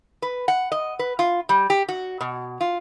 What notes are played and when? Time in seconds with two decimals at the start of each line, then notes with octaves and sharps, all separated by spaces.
0.22 B4
0.48 F#5
0.72 D#5
0.99 B4
1.19 F4
1.49 G3
1.70 G4
1.89 F#4
2.21 B2
2.61 F4